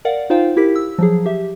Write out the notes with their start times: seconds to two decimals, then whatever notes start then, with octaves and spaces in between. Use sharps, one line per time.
0.05 A#4 D5 F5 F#5
0.30 D#4 F4 C5 F5 G5
0.57 E4 G4 A#4 B6
0.76 E6
0.98 F3 F#3 G#4
1.26 G4 E5